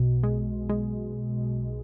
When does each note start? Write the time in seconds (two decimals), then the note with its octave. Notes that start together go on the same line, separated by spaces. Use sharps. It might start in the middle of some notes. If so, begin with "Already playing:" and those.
Already playing: B1 B2
0.23 G#3
0.69 G#3